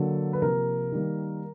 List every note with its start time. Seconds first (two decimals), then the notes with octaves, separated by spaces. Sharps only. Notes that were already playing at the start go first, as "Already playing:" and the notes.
Already playing: D3 F#3 A#3 A4
0.33 B4
0.42 C3 F3 A#3 A#4
0.92 D#3 G3 A#3